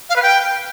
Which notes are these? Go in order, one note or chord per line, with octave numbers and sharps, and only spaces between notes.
F5
B4
G5